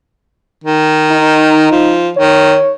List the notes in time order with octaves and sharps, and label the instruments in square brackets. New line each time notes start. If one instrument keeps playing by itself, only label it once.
[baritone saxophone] D#3
[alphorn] D#4
[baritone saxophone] F3
[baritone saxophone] D#3 [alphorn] C#5